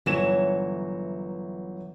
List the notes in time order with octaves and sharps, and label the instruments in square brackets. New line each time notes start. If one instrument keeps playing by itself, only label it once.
[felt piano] G1 E7 [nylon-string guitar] E3 F#3 C#5